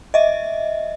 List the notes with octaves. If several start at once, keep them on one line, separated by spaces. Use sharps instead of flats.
D#5 E5